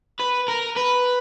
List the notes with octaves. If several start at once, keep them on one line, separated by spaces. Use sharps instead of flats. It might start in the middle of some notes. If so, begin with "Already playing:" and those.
B4
A#4
B4